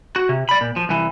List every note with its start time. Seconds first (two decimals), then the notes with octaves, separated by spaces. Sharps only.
0.16 F#4
0.29 C3
0.49 D5 B5
0.61 A#2
0.76 F3
0.89 C2 E3